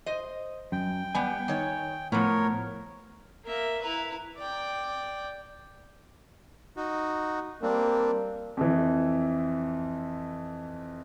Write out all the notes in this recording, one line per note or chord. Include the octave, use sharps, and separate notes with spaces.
C5 D#5
F#2 G5
G3 B3 G#5
D#3 C#5
A2 F3 B3 A#4 C#5
A#3 E5
E4 B4 A#5
D5 G5
D#4 F#4
G3 A#3 C4 D4
F2 E3